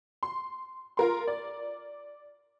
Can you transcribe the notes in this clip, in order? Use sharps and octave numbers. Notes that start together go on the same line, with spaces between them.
C6
F4 A#4 C6
D5